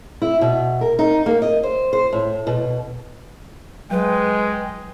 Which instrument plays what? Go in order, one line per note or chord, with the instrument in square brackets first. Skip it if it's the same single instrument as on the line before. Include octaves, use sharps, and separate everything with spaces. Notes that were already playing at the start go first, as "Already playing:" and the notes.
[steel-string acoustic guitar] E4
B2
A#4
D#4
A#3
D#5
C5
C5
A2
B2
[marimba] F#3 [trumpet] G#3 [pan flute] B4 [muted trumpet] G5